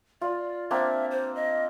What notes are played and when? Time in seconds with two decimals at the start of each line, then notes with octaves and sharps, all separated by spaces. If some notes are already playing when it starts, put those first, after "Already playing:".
0.21 F4 D5
0.71 A#3 C4 D4 E5
1.11 C5
1.35 D#5